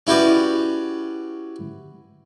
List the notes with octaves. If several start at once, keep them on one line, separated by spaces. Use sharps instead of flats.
C#4 E4 F#4 G4 B4 D5